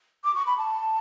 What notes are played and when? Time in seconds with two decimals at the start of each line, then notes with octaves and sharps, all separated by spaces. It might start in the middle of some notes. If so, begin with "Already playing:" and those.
0.24 D6
0.35 C#6
0.47 B5
0.58 A5